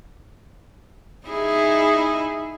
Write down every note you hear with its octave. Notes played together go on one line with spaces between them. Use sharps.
D#4 E4 G#4